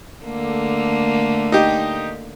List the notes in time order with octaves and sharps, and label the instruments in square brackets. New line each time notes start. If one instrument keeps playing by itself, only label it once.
[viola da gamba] D3 A3 A#3
[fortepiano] D#4 G4